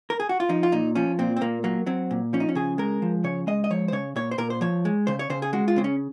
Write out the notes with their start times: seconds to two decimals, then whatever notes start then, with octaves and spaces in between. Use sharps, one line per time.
0.10 A#4
0.20 G#4
0.29 F#4
0.40 F4
0.49 F3 D#4
0.63 F4
0.72 A#2 D#4
0.95 F3 C#4
1.19 A#2 C4
1.36 C4
1.41 A#2 A#3
1.64 F#3 A#3
1.86 F#3 C4
2.11 A#2
2.33 F3 C#4
2.40 D#4
2.49 C#4
2.55 C#3 G#4
2.78 G#3 A#4
3.02 F3
3.24 C#3 C#5
3.47 G#3 D#5
3.64 D#5
3.70 F3 C#5
3.88 C5
3.92 C#3 C#5
4.16 A#2 C#5
4.31 C5
4.38 A#2 A#4
4.50 C5
4.61 F3 C#5
4.85 G#3
5.07 C#3 C5
5.19 C#5
5.30 C#3 C5
5.42 G#4
5.53 G#3 F#4
5.68 F4
5.76 C#3 C4
5.84 C#4